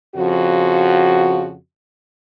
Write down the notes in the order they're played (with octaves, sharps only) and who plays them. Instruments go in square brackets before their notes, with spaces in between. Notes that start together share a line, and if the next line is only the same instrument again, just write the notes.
[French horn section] F2 C#3 F3 F#4